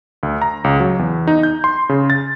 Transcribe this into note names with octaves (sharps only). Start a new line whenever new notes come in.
D2
A#5
C#2
F#3
E2
D#4
G6
C6
C#3
A6